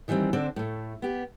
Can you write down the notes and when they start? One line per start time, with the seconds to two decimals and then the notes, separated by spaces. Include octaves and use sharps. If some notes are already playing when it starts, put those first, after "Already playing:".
0.08 D#3 E3 G3 A3 C4
0.33 D3 C4 D4 A4 C5
0.56 A2 A3
1.02 B3 G4